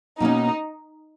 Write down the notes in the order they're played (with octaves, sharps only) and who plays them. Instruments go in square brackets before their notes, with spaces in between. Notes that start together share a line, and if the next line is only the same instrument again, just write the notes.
[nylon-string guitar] B2 A#3 C#4 [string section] D#4